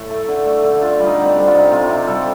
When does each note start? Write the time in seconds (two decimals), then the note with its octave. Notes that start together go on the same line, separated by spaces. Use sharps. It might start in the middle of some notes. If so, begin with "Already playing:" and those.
Already playing: A2 A4
0.10 A3
0.28 D3
0.45 A3
0.63 D3
0.81 D3 F4
0.99 G3 F4
1.06 D#4
1.18 D3
1.24 C4 D4
1.36 G3
1.47 F4
1.54 C3 D#4
1.71 C3 F4
1.89 C3 G4
2.07 G3 A4